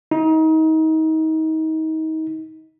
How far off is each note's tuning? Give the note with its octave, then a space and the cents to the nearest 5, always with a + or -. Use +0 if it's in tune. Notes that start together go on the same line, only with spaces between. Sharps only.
D#4 +30